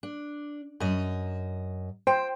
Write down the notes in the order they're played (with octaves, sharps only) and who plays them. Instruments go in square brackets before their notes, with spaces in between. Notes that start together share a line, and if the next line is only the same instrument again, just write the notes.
[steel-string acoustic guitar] D4
F#2 D#5
[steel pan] C5 [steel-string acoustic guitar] G5